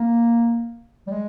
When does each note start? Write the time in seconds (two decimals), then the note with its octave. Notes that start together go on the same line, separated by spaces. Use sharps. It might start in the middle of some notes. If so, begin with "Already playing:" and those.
Already playing: A#3
1.07 G3
1.12 G#3